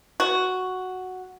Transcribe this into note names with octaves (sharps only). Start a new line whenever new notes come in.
F#4